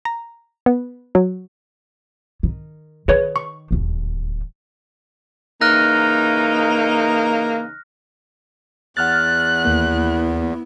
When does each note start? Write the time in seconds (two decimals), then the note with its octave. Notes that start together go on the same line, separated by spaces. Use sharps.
0.05 A#5
0.66 B3
1.15 F#3
2.43 D#3
3.08 D#3 G#4 B4 C#5
3.36 C#6
3.71 D1 D#2
5.61 C#3 E3 A#3 D#4 F6 F#6 A#6
8.97 E2 F#5 F6 F#6 A6
9.65 D#2 A#3 B3 E4